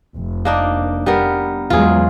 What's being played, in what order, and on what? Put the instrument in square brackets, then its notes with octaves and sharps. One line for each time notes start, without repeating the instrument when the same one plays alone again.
[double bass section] F1
[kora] A#3 D4 D#4
G3 B3 A#4
[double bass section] E2 F#3 G#3 [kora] F4 G#4